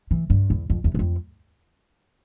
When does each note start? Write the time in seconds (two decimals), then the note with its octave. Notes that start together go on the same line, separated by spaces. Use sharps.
0.11 E3
0.30 G2
0.50 E2
0.70 F2
0.84 E2
0.94 E2
0.99 F2